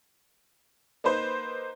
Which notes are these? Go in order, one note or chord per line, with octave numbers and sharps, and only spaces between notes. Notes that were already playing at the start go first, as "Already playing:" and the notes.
A#3 D#4 B4 C5